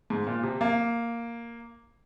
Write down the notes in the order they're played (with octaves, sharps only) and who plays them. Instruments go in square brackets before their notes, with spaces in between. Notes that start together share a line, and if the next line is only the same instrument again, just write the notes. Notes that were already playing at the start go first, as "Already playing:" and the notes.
[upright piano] G#2
A#2
C3
A#3